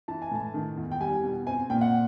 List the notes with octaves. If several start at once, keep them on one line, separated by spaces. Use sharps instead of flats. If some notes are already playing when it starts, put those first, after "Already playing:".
E3 A5
G#5
A2 A5
D#3
E2
G5
G3 G#5
B2
C4 G#5
A#2 G5
F#5